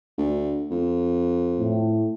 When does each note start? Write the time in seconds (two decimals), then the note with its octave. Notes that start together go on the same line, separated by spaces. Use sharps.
0.18 D2
0.71 F2
1.59 A2